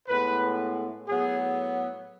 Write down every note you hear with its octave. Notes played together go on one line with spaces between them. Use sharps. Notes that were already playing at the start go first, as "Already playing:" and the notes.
A2 G#3 B3 B4
A2 F#3 B3 G#4